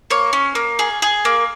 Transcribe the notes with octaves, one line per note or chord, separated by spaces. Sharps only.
A#3 C#5
C#4
A#3
G#4
G#4
A#3